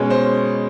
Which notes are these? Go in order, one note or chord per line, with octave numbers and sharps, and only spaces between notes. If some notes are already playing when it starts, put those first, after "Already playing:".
Already playing: B2 G#3 C#4
C5